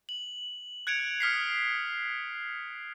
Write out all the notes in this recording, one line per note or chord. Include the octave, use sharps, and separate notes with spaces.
F#7
F#6 G#6 C#7 D7 F7
D#6 F6 B6 C7